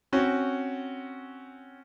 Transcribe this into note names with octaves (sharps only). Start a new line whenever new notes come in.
C4 C#4 F#4